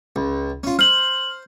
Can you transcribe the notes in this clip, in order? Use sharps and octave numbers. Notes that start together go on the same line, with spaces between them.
C#2
C#4 F4
C5 F6 F#7